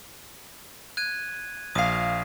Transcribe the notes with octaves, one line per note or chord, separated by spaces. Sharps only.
F#6 G#6 D#7
A#1 F5 D#6 C7